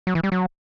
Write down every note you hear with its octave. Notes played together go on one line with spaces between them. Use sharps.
F#3
E3
G3
F#3